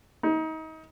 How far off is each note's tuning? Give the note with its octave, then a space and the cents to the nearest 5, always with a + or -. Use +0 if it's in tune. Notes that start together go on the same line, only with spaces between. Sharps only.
D#4 +30